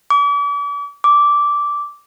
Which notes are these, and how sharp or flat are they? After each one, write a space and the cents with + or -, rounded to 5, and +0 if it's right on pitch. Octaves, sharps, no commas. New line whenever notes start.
D6 -40
D6 -10